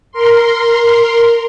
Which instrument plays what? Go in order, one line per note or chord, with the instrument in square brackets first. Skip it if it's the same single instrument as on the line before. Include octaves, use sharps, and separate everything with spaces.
[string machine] A#4 C6